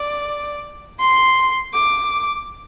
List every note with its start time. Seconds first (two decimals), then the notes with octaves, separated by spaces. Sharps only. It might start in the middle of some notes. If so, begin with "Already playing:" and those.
Already playing: D5
0.99 C6
1.73 D6